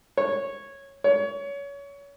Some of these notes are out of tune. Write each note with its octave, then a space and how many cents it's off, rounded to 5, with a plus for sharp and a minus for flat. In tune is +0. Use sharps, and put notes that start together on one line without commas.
C#5 -10
C#5 +25